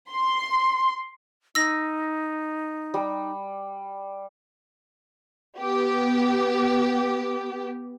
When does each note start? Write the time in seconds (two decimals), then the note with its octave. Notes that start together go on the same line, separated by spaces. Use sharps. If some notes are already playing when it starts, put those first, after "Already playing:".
0.11 C6
1.55 D#4 E6 A#6
2.94 G3
5.58 B3 G4